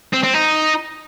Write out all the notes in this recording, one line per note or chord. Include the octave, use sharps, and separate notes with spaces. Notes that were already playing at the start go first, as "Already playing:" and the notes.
C4
C4
D#4